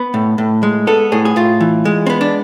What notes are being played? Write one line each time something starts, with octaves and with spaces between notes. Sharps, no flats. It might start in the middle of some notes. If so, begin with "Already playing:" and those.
Already playing: B3
A2
A2
G#3
B3 A4
A2 G#4
G#4
A2 F4
E3
G#3
C4
B3
D4